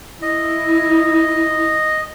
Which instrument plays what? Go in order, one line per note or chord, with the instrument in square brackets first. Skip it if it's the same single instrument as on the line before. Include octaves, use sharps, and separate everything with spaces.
[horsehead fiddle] E4 [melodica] D#5